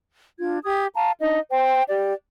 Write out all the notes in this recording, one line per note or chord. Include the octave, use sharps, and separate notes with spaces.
D4 F4 G#6
G4 D#6 G#6
F5 A5 A#5
D4 D#4 D#5
C5 G5
G4 D5